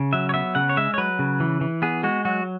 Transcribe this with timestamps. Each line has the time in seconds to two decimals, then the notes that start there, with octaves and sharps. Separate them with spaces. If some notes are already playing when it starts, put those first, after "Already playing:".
Already playing: C#3
0.13 F#3 E5
0.29 C#5
0.34 B3 E5
0.55 C#3 F#5
0.69 C#5
0.77 G#3 E5
0.94 C#5
0.98 F#3 B4
1.19 C#3
1.40 E3
1.61 E3
1.82 B3 G#4
2.03 G#3 F#4
2.25 F#3 F#4